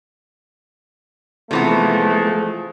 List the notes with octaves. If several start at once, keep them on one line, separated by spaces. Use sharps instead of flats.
C3 E3 F3 G#3 A3 B3